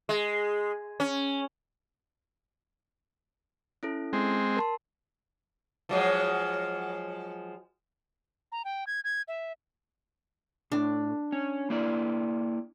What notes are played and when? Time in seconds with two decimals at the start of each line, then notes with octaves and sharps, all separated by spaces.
0.09 G#3
1.00 C#4
3.83 C#4 E4 A4
4.13 G#3 C4
4.57 A#4 A5 C6
5.89 F3 F#3 G#3
8.52 A#5
8.65 G5
8.87 G#6
9.04 G#6
9.28 E5
10.72 A2 D4
11.32 C#4
11.70 A#3 E4 D5